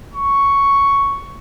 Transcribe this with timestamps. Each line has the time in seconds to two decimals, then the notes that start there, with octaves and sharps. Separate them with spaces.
0.14 C#6